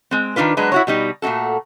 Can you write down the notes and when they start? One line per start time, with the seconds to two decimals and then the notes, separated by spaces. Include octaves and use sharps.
0.11 G#3 C4
0.36 D#3 G#3 D4 F4 B4
0.57 F#3 G#3 B3 D4 B4
0.72 E4 F#4 C#5
0.87 B2 G3 D#4
1.22 A#2 A3 D#4 F#4 A4